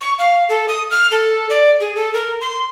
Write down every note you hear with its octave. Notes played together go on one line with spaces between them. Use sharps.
C#6
F5
A4
D#6
F6
A4
D5
G#4
A4
A#4
C6